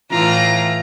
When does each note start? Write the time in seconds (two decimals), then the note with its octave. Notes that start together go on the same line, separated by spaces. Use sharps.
0.12 A2 E3 F4 A#5